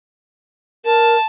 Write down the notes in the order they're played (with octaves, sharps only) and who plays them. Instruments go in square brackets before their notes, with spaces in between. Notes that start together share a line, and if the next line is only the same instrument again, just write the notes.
[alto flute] A#4 [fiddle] A5